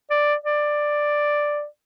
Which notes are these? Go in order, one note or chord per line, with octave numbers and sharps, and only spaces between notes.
D5
D5